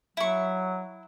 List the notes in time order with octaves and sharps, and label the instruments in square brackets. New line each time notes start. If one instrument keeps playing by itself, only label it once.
[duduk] F#3 [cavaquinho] E4 C#6